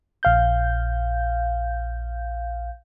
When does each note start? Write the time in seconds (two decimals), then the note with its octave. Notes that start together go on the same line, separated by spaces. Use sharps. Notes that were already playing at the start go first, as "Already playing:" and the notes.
0.23 A#1 F5 G6